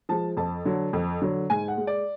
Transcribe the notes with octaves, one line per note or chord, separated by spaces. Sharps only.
F3 G#3 A5
F2 A5
D3 F#3
F2
D3 F#3
G#2 G#5
F#5
G#3
D5